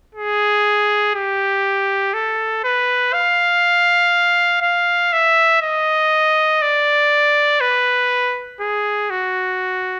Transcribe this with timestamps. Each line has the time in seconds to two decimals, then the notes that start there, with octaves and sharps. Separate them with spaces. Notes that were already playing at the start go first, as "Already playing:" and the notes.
0.15 G#4
1.15 G4
2.14 A4
2.64 B4
3.14 F5
4.62 F5
5.13 E5
5.62 D#5
6.62 D5
7.61 B4
8.61 G#4
9.10 F#4